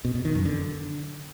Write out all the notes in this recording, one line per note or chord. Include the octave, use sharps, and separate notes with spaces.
B2
B2
D#3
F#2
D3